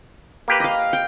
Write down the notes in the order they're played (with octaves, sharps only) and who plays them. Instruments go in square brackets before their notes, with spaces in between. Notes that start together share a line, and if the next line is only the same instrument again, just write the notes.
[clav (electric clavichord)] A#3 G4 B4
[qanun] D#5 F5
G5